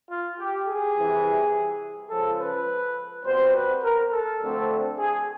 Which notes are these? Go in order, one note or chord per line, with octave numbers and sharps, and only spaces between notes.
F4
G4
G#4
C2 C3 E3 G3
C#2 C#3 F3 A4
B4
B2 G3 C4 C5
B4
A#4
A4
D2 D3 F3 A3 C4
G#4